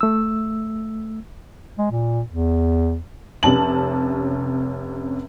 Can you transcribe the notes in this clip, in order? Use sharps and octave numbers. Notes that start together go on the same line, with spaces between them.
A3 E6
G#3
A#2
E2
F1 C3 C#4 A5 F#7